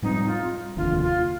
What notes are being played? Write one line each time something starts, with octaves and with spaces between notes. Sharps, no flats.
A2 G3 C4 D#4
F4
F1 D#2 D3 F4
F4